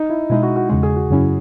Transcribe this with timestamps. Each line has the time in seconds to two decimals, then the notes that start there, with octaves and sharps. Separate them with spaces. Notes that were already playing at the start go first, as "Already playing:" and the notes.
Already playing: D#4
0.09 E4
0.30 B2 G#3 D#4 E4
0.43 F#4
0.56 F#4
0.69 E2 C#3 G#3 F#4
0.83 G#4
0.96 F#4
1.10 F#2 C#3 F#3 C#4 E4